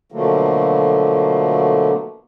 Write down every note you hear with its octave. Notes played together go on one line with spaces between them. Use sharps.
B2 D3 F3 F#3 A3 A#3